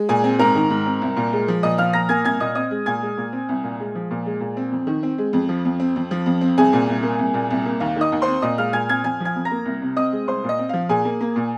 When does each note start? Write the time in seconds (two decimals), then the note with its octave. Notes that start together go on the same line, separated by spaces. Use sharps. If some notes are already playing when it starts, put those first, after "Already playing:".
Already playing: G#3
0.09 A#2 G#4 G#5
0.24 C4
0.39 G#2 A#4 A#5
0.55 D#3
0.70 G#2
0.86 C4
1.02 C2
1.16 A#2
1.33 G#3
1.48 F3
1.63 A#2 D#5 D#6
1.78 F3 F5 F6
1.93 A#2 A#5 A#6
2.09 A#3 G#5 G#6
2.24 C2 G#5 G#6
2.40 A#2 D#5 D#6
2.55 C4 D#5 D#6
2.71 G#3
2.86 A#2 G#5 G#6
3.02 G#3
3.17 A#2
3.33 C4
3.49 C2
3.64 A#2
3.80 G#3
3.95 F3
4.11 A#2
4.26 G#3
4.40 A#2
4.57 C4
4.72 F2
4.87 D#3
5.03 C4
5.18 G#3
5.33 F2
5.49 F3
5.65 F2
5.80 C4
5.96 F2
6.11 F3
6.26 F2
6.41 C4
6.58 C2 G#4 G#5
6.73 A#2
6.89 C2
7.03 A#3
7.19 C2
7.34 A#2
7.50 C2
7.66 A#3
7.80 D#2 F5
7.96 D#3 D#5 D#6
8.12 D#2
8.22 C5 C6
8.28 C4
8.42 A#2 D#5 D#6
8.58 G#3 F5 F6
8.73 A#2 G#5 G#6
8.89 C4 G#5 G#6
9.04 F2 G#5 G#6
9.20 F3
9.25 G#5 G#6
9.36 F2
9.45 A#5 A#6
9.51 A#3
9.65 C2
9.82 C3
9.97 C4 D#5 D#6
10.12 G#3
10.27 C2 C5 C6
10.44 A#2
10.49 D#5
10.58 C4
10.69 F3 F5
10.89 A#2 G#4 G#5
11.05 A#3
11.21 A#3
11.36 A#2